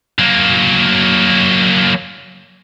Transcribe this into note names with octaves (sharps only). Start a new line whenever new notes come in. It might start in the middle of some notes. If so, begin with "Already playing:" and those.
F#3 A#3